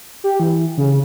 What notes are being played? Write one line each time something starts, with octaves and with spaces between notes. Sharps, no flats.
G4
E3
C#3